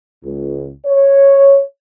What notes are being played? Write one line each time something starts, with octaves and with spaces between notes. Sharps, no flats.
C#2
C#5